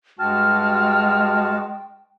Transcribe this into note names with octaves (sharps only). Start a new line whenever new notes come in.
G2 G#3 F#4 G5 A5 F6